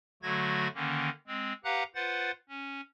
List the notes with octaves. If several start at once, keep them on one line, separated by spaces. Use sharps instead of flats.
D3 F#3 A3 F#4 G#6 A#6
D3 D#3 A#3 C#4
G#3 C4
G4 B4 F5 F#5 A#5 F#6
F4 B4 C5 F#5 A6
C#4